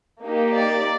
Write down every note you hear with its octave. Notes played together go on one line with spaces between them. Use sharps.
A#3 D#4 G4
D5